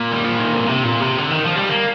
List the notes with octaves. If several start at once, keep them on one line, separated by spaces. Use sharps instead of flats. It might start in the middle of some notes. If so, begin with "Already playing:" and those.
Already playing: A#2
G3
F3
D#3
D3
C3
A#2
C3
D3
D#3
F3
G3
A#3